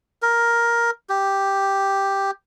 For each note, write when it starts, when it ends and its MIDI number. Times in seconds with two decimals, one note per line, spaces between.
0.22 0.91 70
1.09 2.31 67